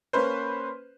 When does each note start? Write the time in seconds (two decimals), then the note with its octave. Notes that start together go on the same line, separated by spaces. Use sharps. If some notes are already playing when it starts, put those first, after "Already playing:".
0.13 A#3 C#4 B4 C5